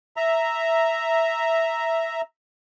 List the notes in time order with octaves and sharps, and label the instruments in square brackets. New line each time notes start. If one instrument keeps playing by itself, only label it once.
[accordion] E5 A#5